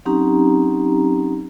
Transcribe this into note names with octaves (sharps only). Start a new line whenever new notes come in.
F#3 C4 C#4 D#4 G4 A#5